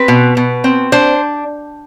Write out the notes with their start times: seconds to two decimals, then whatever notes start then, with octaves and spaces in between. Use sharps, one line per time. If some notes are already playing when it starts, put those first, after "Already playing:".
Already playing: C4 B4
0.08 B2
0.37 B2
0.64 C4
0.92 D4 C5